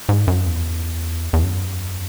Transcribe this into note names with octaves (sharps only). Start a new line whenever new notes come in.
G#2
F#2
E2
E2
F#2